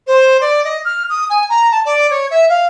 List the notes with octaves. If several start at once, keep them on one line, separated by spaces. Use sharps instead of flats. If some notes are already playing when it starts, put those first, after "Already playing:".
C5
D5
D#5
F6
D#6
G#5
A#5
A5
D5
C#5
E5
F5